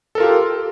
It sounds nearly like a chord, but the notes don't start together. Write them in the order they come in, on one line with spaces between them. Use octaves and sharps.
A4 A#4 F4 G4